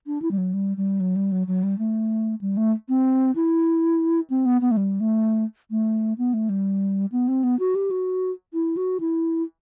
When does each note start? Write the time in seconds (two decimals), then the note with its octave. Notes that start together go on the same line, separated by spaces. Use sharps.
0.07 D4
0.22 E4
0.31 G3
0.38 F#3
0.54 G3
0.77 G3
1.00 F#3
1.16 G3
1.32 F#3
1.47 F#3
1.63 G3
1.79 A3
2.41 G3
2.57 A3
2.89 C4
3.36 E4
4.30 C4
4.46 B3
4.61 B3
4.71 A3
4.77 G3
5.00 A3
5.71 A3
6.18 B3
6.34 A3
6.49 G3
7.12 B3
7.28 C4
7.43 B3
7.59 F#4
7.75 G4
7.91 F#4
8.54 E4
8.77 F#4
9.00 E4